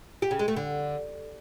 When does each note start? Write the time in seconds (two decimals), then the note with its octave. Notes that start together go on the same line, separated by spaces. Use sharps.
0.22 G4
0.31 C#3
0.39 G#3
0.48 A3
0.56 D3